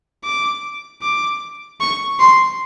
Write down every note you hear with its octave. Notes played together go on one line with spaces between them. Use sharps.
D6
D6
C#6
C6